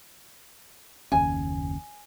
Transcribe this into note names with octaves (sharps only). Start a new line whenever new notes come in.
F#1 D#2 C#4 G#5